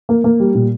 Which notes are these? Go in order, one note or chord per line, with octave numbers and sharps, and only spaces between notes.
A#3
A#3
G3
A#2